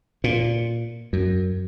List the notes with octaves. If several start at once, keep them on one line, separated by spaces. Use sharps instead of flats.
A#2
F#2